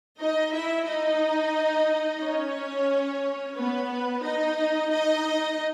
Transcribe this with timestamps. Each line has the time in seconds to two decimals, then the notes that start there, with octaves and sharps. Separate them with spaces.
0.19 D#4 D#5
0.53 E4 E5
0.87 D#4 D#5
2.21 C#4 C#5
3.56 B3 B4
4.23 D#4 D#5
4.91 D#4 D#5